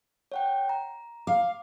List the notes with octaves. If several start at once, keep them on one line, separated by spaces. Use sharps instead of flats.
C#5 F#5 G5
A#5
F5 D6